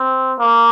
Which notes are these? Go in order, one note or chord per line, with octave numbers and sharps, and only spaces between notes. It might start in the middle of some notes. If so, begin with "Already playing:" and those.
Already playing: C4
A#3